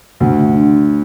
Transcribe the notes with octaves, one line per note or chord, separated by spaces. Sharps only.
D2
D3